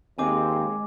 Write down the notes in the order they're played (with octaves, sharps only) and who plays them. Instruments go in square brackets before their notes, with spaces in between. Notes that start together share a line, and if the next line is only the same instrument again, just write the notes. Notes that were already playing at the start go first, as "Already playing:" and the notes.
[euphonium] D#2 [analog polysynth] G#3 [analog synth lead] C4 [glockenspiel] G#5 D6